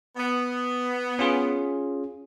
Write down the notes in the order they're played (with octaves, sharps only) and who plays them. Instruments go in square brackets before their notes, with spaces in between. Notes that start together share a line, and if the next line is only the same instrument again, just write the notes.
[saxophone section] B3
[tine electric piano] C#4 F4 G#4